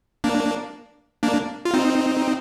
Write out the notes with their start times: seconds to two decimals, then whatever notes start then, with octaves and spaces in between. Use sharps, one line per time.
0.24 A#3 D4
1.23 A#3 D4
1.65 F4
1.74 C4 D#4